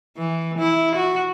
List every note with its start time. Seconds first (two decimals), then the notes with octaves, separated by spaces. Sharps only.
0.17 E3
0.58 E4
0.96 F#4